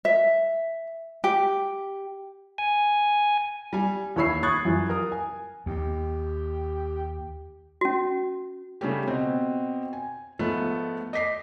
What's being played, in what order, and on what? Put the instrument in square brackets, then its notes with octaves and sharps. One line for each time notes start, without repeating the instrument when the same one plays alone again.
[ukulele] E5
G4
[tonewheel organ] G#5
[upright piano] G3 G#5
D#2 E4 C#5 B5 E6 C7
B5 C#6 D#6 F#6 G#6 A6
F#2 E3 F3 G3
A#4 D#6
G#5
[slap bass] D#2 [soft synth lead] G4
[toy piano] C#4 F#4
[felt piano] C#3 G3 A3 C#4 G4
B2 C4
G#5
G#2 F3 A3 B3
D#5 D6 B6 C7